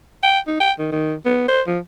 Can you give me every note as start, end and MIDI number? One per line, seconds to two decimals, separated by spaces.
0.23 0.39 79
0.47 0.55 63
0.60 0.72 79
0.79 0.87 51
0.92 1.14 51
1.25 1.48 59
1.49 1.62 72
1.67 1.79 53